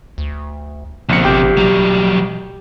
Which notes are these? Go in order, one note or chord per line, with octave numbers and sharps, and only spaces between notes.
D2
A#1 B2 C4 C#7
G#1 G4
B2 F#3 G3